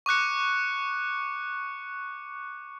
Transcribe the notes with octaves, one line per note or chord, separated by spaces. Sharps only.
C#6 D6 F#6 C#7